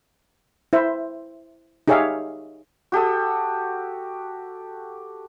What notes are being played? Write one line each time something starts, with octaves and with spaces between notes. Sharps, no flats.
E4 C5 E5
D#4 G4 G#4 C#5 E5 F5
F#4 G4 A4 D#6